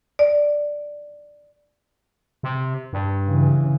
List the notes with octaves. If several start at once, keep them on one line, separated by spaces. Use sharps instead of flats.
D5
C3
G2
C#3 E3